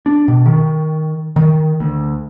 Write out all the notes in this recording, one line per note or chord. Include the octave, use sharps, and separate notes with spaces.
D4
B2
D#3
D#3
D2